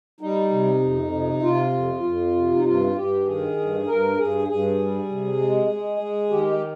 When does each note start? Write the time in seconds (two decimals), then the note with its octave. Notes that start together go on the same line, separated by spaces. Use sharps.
0.21 G3 D#4
0.51 C3
0.81 F2
1.12 C3
1.43 C3 F4
1.73 F2
2.03 F2
2.35 C3
2.56 D#4
2.64 G2 F4
2.95 G2 G4
3.26 D#3 G#4
3.57 G2
3.86 G2 A#4
4.17 G2 G#4
4.48 G2 G#4
4.79 G3
5.09 C3
5.39 G#3
5.70 G#3
6.00 G#3
6.30 D#3 G4